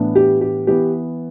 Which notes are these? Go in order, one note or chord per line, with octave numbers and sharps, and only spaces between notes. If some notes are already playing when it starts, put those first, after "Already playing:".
Already playing: A2 E3 B3 D4
G4
G4
E3 B3 G4